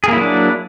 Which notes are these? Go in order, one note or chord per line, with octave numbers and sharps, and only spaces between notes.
F#3 A#3 D4 E4 G#4